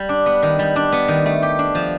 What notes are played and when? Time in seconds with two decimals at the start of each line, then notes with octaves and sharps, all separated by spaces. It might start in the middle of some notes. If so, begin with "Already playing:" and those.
Already playing: G3
0.09 D4
0.26 B3
0.42 D#3
0.59 G3
0.76 D4
0.92 B3
1.08 D#3
1.26 A3
1.42 G4
1.59 D4
1.75 F3